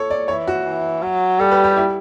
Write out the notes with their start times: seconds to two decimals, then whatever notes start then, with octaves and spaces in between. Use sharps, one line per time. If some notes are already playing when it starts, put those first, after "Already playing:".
Already playing: A4 C#5
0.10 D5
0.28 E3 C#5
0.47 F#4
0.65 E3
1.02 F#3
1.40 G3 A4
1.51 B4
1.64 G4
1.77 E4